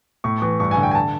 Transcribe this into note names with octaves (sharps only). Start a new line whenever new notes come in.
A2 C#6
E3 C#6
G2 C#6
G#5
D3
G5
G#5
A5